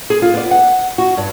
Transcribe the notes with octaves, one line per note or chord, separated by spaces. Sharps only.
G#4
F4
B3 D5
F#5
F#4
G2